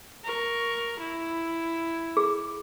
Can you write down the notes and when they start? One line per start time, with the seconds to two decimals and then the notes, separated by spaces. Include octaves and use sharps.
0.24 A#4 C#6
1.00 E4
2.17 G#4